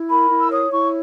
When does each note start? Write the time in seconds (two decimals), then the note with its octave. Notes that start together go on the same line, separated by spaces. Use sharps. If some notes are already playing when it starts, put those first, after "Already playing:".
Already playing: E4
0.09 A#4 B5
0.30 E4
0.40 E6
0.51 C#5 D#6
0.71 E4 C#6